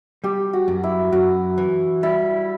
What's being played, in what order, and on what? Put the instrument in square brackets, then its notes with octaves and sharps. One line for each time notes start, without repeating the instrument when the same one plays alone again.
[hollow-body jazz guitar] G3 [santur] G4
[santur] F#4
[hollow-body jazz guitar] F#2
[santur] E4
[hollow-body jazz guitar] F#2 [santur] F#4
[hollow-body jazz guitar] E3
[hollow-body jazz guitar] G3 [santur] E4